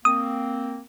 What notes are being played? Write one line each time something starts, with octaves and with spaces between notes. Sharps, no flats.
A#3 C4 D#6